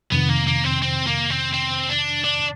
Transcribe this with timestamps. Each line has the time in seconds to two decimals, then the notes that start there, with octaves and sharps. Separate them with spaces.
0.12 F2 C3 D#3 B3
0.30 A#3
0.48 A#3
0.65 C4
0.82 C4
1.07 A#3
1.30 C4
1.53 C4
1.89 D4
2.24 D4